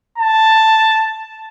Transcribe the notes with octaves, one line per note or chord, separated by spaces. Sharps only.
A5